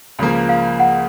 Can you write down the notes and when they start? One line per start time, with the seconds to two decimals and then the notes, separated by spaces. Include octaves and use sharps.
0.19 C#2 C#3 F3 A#3
0.49 F5
0.80 F#5